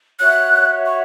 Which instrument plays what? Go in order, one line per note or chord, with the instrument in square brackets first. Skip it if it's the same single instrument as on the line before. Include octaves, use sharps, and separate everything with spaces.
[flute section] F#4 C#5 E5 [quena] F#6
[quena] C#6